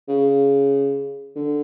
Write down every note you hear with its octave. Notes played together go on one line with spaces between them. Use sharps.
C#3
D3